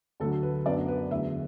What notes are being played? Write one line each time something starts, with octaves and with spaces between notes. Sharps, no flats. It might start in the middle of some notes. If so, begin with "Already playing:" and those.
D2 D3 F#3 A4
B4
F#2 F#3 B3 D4 D5
B4
E2 D3 F#3 A3 E5